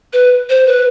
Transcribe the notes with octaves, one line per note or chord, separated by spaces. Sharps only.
B4
C5
B4